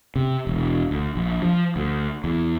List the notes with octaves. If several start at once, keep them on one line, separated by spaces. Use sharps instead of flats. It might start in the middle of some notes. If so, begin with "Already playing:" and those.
C3
E1
D2
A#1
F3
D2
E2